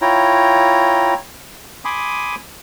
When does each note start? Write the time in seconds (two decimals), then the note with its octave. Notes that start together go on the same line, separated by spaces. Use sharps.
0.02 E4 F4 C#5 G5 A#5
1.85 G#5 B5 C6 D6 D#6